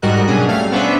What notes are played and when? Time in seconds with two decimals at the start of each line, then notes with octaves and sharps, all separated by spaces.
0.02 G#2 G3 F#4 A#4 D#5 F#6
0.27 B2 F#3 C#4 D4 G#4
0.47 G3 A3 F5 F6
0.72 B3 C#4 D4 C5 E5